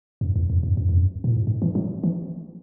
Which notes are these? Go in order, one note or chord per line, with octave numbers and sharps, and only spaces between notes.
F#2
E2
E2
F#2
F#2
E2
F#2
A#2
G#2
G#2
E3
F#3
E3